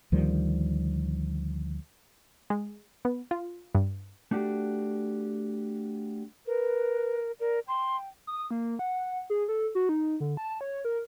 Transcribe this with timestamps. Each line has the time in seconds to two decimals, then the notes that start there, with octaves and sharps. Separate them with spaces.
0.12 D2 D#3 F3 G3
2.50 G#3
3.05 B3
3.31 F4
3.74 G2
4.31 A3 D4 F#4 G4
6.47 A#4 B4
7.40 A#4 D5
7.68 G5 C6
8.27 D#6
8.51 A#3
8.79 F#5
9.30 G#4
9.48 A4
9.75 F#4
9.89 D#4
10.20 D3
10.37 A5
10.61 C#5
10.85 A#4